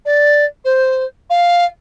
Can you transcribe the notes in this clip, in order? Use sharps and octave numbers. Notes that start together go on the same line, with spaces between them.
D5
C5
F5